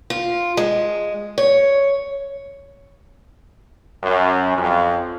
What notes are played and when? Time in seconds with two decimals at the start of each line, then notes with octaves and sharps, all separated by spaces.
0.10 F4
0.57 G#3
1.38 C#5
4.03 F#2
4.58 F2